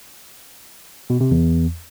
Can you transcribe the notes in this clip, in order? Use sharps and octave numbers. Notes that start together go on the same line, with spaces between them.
B2
C3
E2